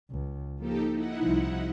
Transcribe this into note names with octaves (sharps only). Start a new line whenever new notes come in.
C#2
F3 A#3 D#4 G4 A4
D#4 E4 F#5
C2 F3